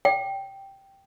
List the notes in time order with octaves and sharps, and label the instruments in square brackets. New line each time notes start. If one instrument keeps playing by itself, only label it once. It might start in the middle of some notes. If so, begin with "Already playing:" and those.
[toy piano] G5